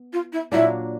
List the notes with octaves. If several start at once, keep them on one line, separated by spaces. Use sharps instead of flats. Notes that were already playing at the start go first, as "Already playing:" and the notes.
Already playing: B3
F4
E4
A#2 F#3 A#3 D4 E4